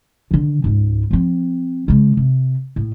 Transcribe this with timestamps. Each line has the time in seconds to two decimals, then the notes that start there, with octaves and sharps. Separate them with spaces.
0.31 D3 D#3
0.64 C#2 G#2
1.11 F3 C4
1.88 C#3 G#3
2.17 C3
2.76 A2